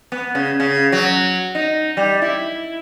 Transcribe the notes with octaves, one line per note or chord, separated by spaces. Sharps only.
B3
C#3
C#3
F#3
D#4
G3
E4